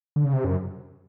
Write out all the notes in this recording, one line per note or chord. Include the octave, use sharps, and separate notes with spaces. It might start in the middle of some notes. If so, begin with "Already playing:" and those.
D3
C#3
C3
F#2